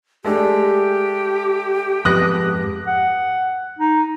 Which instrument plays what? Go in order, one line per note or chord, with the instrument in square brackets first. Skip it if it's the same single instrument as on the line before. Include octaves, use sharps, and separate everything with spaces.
[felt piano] G#3 A3 D4 [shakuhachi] G4
[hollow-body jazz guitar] F2 G#2 B3 [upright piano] D#6 F#6 A#6
[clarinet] F#5
D#4